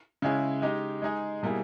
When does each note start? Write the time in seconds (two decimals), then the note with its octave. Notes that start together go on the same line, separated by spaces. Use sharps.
0.22 C#3 G#3 C#4 E4 G#4
0.62 G#3 D#4 G4
1.02 G#3 D#4 G#4
1.43 B2 G3 A#3 E4 G#4